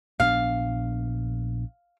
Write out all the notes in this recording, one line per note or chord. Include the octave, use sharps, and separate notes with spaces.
A#1 B3 D4 F5